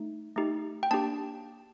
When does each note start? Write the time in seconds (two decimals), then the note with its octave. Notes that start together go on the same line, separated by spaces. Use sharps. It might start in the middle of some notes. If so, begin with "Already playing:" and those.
Already playing: A3 D#4
0.36 A3 D#4 G4
0.83 G5
0.91 A#3 D4 G4 A5